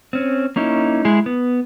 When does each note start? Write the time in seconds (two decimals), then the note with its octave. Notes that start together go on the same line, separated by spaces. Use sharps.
0.13 C4 C#4
0.56 A#3 C#4 D#4 E4
1.05 G#3 E4 G#4
1.26 B3